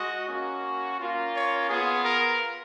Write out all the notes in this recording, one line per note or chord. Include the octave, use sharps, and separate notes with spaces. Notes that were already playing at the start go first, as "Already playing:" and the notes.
Already playing: G#3 F#4 D#5
A#3 C#4 F#4
A#3 C#4 F4
C#5
B3 F4 G#4
A#4